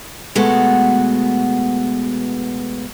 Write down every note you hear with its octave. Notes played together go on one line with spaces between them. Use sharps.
B2 G#3 A3 B3 F#4